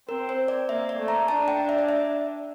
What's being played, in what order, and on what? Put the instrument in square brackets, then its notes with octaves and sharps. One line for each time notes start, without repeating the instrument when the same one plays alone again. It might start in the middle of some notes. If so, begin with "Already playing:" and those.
[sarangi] C4 [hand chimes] A#4
[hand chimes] C5
D5
[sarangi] A#3 [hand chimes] E5
[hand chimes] D5
[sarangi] A3
[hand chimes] A#5
[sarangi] D4 [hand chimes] A5
[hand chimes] G5
E5
D5
E5